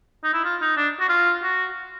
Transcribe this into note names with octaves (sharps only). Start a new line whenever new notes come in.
D#4
E4
F4
D#4
D4
F#4
F4
F#4